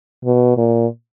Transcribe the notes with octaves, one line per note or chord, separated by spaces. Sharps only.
B2
A#2